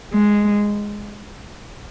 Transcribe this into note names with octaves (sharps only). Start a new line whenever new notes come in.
G#3